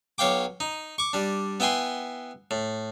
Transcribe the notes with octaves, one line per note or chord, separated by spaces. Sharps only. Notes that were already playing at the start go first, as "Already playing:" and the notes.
B1 C#5 F5 G5 D6
D#4
C#6 D6
G3 D4
B3 E4 G5 G#5 C6
A2